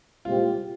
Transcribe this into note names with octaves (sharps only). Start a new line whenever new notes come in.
C2 A#2 G#3 C4 F4 G4